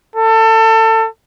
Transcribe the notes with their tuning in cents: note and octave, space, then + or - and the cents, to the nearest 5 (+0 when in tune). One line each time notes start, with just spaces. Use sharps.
A4 +25